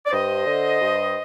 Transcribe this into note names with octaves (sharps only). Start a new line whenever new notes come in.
D5
G2 C5 D#5
D3
G2